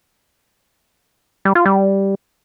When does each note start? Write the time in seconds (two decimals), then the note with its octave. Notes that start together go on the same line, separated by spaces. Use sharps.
1.45 G3
1.55 F4
1.65 G3